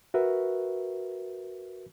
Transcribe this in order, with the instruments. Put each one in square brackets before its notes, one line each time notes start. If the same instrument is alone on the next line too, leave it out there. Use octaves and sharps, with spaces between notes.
[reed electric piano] F#4 A#4 B4 E5